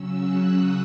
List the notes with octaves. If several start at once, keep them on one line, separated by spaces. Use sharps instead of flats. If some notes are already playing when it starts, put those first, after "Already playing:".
Already playing: C#3 F#3 C#4 E6
F#6
D#6